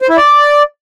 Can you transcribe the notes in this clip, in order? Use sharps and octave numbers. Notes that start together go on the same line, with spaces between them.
C5
E4
D5